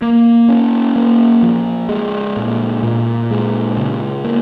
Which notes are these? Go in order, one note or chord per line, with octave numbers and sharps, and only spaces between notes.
A#3
C#4
A#3
F3
G#3
A#2
A#2
G#3
C#3
A#3